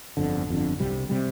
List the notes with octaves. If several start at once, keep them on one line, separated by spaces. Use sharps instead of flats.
G1 F2 D3
G1 F2 D3
C2 C3 G3
C3 G3